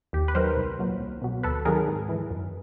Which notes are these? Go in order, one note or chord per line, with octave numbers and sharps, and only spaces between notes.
D#2 G4
B4
D#3 F#3 A#4 C5
C2
A#2 F#3
C2
B2 F#3
D2 A4 B4
C3 D#3 F#3 G#4 A#4
G#2
E3
F#2